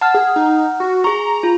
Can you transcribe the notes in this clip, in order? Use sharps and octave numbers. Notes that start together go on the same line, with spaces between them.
F#5 A5 F6
G#4
D#4
F#4
G#4 A#5 C#6
F4